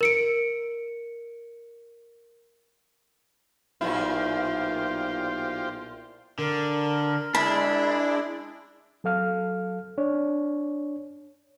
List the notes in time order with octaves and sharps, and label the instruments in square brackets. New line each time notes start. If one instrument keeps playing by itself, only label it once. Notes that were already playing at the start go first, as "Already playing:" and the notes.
[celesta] A#4 C#7 D7
[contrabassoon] B1 [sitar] A#2 E4 [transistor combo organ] F4 G4 C5
[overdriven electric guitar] D3 [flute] A#4
[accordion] G#3 E4 [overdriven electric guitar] D4 [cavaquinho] B5
[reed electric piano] F#3 A4 F5 F6
D4 C#5